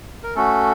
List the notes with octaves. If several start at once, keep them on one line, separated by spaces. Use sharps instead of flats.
A#4
A3 C#4 F#4 A4